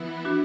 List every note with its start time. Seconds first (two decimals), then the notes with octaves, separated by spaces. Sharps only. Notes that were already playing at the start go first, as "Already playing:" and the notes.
Already playing: E3 B3 E4
0.25 D4 F#4